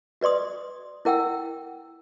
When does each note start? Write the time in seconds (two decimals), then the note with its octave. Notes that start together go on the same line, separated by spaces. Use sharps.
0.21 F#4 B4 D5 C6 D#6
1.05 E4 A#4 F#5 G5 E6